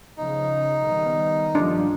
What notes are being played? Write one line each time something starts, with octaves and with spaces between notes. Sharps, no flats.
C#3 F3 D#4
D#3 G3 B3
G2 F3 G3 D4